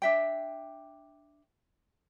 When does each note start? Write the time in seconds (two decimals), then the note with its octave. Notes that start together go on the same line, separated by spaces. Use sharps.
0.02 D4 E5 G5